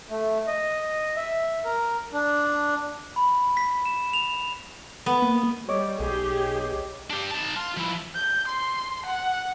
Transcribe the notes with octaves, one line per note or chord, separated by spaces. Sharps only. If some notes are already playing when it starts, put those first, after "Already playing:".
A3
D#5
E5
A#4
D4
B5
B6
E7
F7
B3
A#3
G3 C#5 D#5 D6
B1 G4 G#4
D4 G4
D#4 A5
F4
F3 E4
G6
C6
F#5